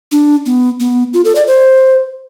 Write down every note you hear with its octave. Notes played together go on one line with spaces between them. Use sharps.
D4
B3
B3
F4
A4
D5
C5